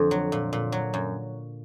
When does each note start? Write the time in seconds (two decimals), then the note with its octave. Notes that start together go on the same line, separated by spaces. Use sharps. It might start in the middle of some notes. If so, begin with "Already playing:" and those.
Already playing: F2 D3
0.11 F#3
0.32 A#2
0.53 A#2
0.72 F#3
0.94 F#2